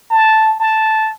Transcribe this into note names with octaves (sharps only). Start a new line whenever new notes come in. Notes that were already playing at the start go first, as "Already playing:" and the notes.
A5
A5